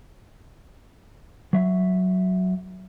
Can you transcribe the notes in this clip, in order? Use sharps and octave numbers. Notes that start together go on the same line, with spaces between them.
F#3 E5